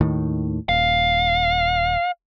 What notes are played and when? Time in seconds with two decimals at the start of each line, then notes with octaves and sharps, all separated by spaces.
0.01 D#2 A2 D#3
0.69 D#1 F5